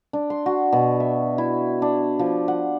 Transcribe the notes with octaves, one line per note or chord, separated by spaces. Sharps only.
D4
C6
F#4
B2
E5
E4
D4
F3
F#5